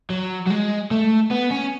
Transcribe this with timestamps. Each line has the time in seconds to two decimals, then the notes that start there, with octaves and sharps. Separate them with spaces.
0.10 F#3
0.47 F#3
0.51 G#3
0.91 A3
1.31 B3
1.51 C#4